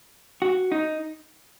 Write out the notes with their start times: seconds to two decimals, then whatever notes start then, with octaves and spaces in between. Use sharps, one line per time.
0.42 F#4
0.72 D#4